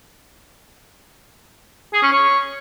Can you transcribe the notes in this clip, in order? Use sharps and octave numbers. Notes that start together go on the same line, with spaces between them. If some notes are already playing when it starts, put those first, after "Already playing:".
G#4
C#4
C#5